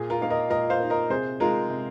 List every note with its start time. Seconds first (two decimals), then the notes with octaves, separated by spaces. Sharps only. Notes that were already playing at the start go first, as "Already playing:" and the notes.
Already playing: A#2 G#4
0.10 F4 A#4
0.21 A#3 D#4 F5
0.30 A#4 D#5
0.50 A#2 A#4 D#5
0.70 C5 F5
0.80 A#3 D#4
0.90 A#4 D#5
1.10 C3 G#4 C5
1.40 G#3 D#4 F4 A#4
1.70 C3